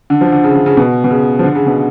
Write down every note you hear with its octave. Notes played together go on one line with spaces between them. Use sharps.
D3
F3
D3
C#3
D3
C#3
B2
B2
C#3
F3
D3
C#3
B2